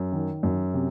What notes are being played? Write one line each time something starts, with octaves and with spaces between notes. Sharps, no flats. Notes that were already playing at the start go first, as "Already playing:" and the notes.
Already playing: F#2
D#3
F#2
C3